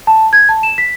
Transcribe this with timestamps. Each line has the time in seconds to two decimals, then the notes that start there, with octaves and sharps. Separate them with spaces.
0.07 A5
0.33 G#6
0.49 A5
0.63 E7
0.78 B6